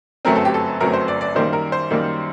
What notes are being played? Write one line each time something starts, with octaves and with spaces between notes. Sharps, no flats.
G1 F#2 F#3 A3 C4 A#4
A4
G4
A4
G1 F#2 F#3 A3 C4 A#4
C5
D5
D5
F#2 D#3 G3 A#3 C5
A#4
C5
F#2 D#3 G3 A#3